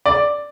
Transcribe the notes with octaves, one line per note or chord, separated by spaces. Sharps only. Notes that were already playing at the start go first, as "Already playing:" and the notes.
D5